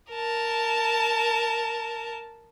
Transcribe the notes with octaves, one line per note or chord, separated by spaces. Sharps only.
A#4 A5